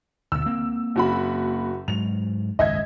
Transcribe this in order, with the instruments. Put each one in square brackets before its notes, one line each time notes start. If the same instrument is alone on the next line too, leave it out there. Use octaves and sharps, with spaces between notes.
[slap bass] D2 B2 [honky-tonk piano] E6
[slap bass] A#3 C4
[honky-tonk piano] F#1 F#4 B5
[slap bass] G#2 F#3 [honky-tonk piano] F7
[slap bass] G#1 C#2 F#2 [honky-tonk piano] D#5 E5 G#6